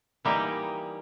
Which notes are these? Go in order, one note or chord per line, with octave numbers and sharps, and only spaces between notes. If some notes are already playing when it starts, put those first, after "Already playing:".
E3 G3 A#3 D#4 G4